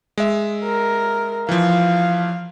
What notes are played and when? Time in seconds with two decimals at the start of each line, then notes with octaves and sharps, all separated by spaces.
0.18 G#3 E5
0.64 A#4
1.49 E3 F3 F5